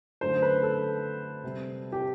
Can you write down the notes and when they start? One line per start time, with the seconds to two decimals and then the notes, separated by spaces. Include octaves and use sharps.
0.21 F#2 D3 A3 C5
0.42 B4
0.63 A4
1.44 C3 G3 C4
1.92 G4